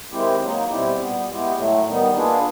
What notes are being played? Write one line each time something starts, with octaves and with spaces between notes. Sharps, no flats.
D#3 G#3 C4 E4 G4
F#3 A#3 D#4
B2 G3 C4 E4 G4
A#2 G3 B3
G#3 B3 E4 G4
A2 F#3 A3
D#3 G3 B3 D#4
A#3 D4 F4 G#4 B4